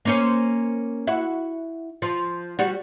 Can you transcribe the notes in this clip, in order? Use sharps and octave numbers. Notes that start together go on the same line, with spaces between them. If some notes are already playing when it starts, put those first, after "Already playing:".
A#3 C#4 C5
E4 F#4
F3
G3 F#4